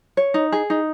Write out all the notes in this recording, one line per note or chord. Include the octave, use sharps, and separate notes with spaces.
C#5
D#4
G#4
D#4